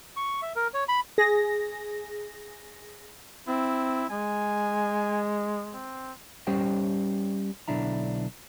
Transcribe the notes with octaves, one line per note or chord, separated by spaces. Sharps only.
C#6
E5
A#4
C#5
B5
G#4 A#6
C4 E4
G#3 G#5
C4
G3 C#4 G4 C5 C#5 G5
B1 D3 D4 E4 A#5